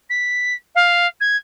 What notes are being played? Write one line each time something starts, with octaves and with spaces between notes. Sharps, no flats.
B6
F5
G#6